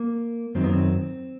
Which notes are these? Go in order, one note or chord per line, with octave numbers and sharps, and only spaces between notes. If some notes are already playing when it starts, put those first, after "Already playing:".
Already playing: A#3
F#2 D#3 F#3 C4
B3
C4